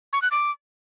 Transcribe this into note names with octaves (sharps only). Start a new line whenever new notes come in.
C#6
F#6
D6